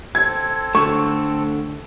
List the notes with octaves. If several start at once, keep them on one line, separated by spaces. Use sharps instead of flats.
C4 A4 G#6
D3 A3 C#6